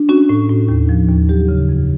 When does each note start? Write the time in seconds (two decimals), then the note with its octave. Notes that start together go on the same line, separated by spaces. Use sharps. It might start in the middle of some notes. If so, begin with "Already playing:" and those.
Already playing: D4
0.09 C#4 F#4
0.29 A2
0.49 A2
0.69 D#2
0.89 F3
1.09 D#2
1.29 F#3 G4
1.49 C#3
1.69 F2